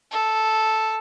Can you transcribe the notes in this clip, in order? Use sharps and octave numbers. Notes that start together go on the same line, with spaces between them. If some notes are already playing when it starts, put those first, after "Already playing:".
A4